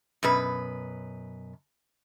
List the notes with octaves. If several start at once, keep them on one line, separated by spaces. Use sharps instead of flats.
F#2 B2 B4